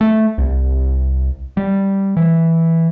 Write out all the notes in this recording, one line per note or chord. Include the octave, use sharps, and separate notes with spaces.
A3
C2
G3
E3